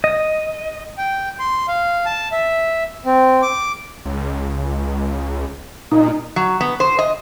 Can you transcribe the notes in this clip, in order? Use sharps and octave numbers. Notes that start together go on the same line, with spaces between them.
D#5
G5
C6
F5
A5
E5
C4
D6
C#2
A#2 D#4
F#3
B3
C5
D#5